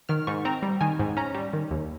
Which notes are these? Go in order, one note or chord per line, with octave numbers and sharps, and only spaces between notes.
D#3 F6
G#2 C#6
C4 A#5
G3
D#3 G#5
G#2
C#4 A#5
G3
D#3
D#2